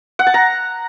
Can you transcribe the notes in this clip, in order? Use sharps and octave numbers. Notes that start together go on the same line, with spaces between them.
F#5
A5
A#5